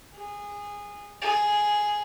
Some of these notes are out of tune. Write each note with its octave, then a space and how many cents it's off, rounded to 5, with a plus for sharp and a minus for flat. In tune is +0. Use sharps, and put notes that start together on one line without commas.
G#4 -20
G#4 +0